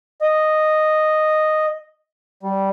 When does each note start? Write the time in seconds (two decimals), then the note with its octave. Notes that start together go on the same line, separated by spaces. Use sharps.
0.21 D#5
2.43 G3